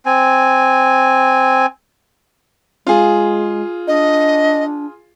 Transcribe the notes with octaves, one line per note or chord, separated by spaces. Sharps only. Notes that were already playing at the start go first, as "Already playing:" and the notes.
C4 G#5
G#3 F4 G#4
D4 D#5